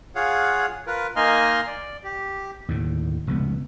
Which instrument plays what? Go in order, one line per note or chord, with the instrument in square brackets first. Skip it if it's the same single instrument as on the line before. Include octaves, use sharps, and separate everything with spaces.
[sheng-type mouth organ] F4 G#4 C#5 F5 F#5
F4 A#4 B4
A#3 D#4 D#5 G#5 C6 F6
D5
G4
[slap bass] D#2 A2 D3
F1 C#2 B3